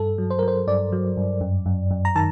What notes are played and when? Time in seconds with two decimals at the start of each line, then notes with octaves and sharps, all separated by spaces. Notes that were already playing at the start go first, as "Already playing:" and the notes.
Already playing: G2 A4
0.18 F#3
0.30 C5
0.39 F#3 A#4
0.48 C5
0.67 G2 D5
0.92 F#3
1.17 G2
1.41 F#2
1.66 F#2
1.91 F#2
2.05 A#5
2.16 D#3 A5